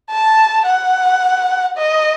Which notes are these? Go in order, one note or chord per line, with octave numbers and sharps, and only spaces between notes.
A5
F#5
D#5